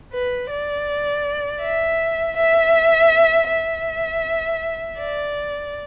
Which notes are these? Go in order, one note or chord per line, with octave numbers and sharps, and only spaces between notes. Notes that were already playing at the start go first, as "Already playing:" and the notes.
B4
D5
E5
E5
E5
D5